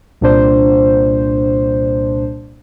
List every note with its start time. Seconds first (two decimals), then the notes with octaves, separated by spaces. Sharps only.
0.21 C2 A#2 D4 C5